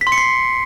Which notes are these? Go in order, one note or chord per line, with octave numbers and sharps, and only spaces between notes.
B6
C6
C#7
C7